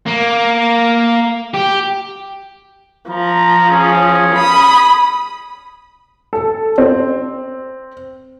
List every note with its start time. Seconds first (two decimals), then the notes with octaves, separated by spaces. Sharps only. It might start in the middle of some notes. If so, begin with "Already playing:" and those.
0.08 A#3
1.54 G4
3.09 F3 A#5
3.70 C#4 G#4
4.34 B5 D#6
6.33 A4
6.78 C4